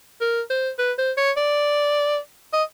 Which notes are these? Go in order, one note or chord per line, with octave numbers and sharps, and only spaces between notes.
A#4
C5
B4
C5
C#5
D5
D#5